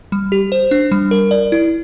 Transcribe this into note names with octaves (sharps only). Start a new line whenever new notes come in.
G3
G4
C5
D4
G3
A#4
D5
E4